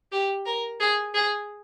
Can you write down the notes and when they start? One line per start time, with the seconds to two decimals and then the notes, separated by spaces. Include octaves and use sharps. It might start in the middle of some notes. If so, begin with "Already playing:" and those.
0.12 G4
0.46 A#4
0.80 G#4
1.14 G#4